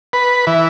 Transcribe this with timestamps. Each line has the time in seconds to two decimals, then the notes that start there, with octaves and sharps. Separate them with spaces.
0.13 B4
0.47 E3